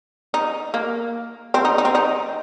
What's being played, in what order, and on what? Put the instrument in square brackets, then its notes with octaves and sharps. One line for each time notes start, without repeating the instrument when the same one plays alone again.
[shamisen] D#4
A#3
C4
D#4
D#4
C4
D#4